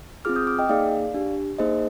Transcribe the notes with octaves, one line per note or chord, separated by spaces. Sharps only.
C4 F4 G#4 D6 F6
D#6 G6
D6 F6
D#5 G5
A#3 D#4 G#4 D5 F5
D4 G4
A#3 D#4 G#4 C5 D#5